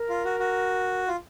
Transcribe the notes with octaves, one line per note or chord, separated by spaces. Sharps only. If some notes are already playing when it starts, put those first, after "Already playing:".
Already playing: A#4
F4
F#4
F#4
F4